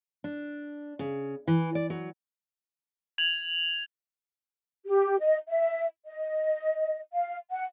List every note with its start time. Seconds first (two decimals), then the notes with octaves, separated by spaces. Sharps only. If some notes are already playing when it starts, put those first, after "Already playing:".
0.24 D4
0.99 C#3
1.47 E3
1.75 D5
1.90 F#3
3.18 G#6 F7 F#7
4.86 G4
5.20 D#5
5.49 E5
6.06 D#5
7.13 F5
7.51 F#5